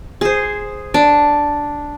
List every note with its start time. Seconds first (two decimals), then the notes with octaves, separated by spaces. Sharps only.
0.21 G#4 C5
0.94 D4